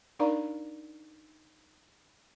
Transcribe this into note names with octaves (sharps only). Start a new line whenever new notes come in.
D4 D#4 A#4 D5 F5 A#5